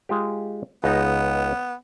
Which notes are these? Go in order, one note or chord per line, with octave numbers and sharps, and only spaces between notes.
G#3 F4 G4
C#2 B3 D#4 A#5